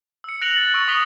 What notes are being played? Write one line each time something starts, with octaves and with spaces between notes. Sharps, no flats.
E6 C#7
F#6 A#6 C#7 D7 F7 F#7
A6 C#7
C#6 E6 D7
C#6 D#6 B6 F7 G7